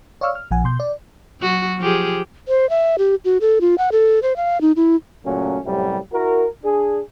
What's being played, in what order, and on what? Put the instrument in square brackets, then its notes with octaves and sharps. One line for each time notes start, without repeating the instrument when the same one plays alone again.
[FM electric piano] C#5 D5 F5 C#6 E6 F6
F6
A#1 F3 F#5 G#5
B2 C6 G6
D5
[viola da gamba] F#3 F#4
F3 G4 G#4
[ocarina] C5
E5
G4
F#4
A4
F4
F#5
A4
C5
F5
D#4
E4
[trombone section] A#2 C#3 F#3 A3 C#4
F#2 A2 C3 F#3 G3
E4 F#4 A#4
D4 G#4